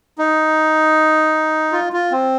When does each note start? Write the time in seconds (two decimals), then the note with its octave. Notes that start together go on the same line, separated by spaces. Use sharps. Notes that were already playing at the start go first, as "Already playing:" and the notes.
0.18 D#4
1.72 F4
1.93 F4
2.11 C4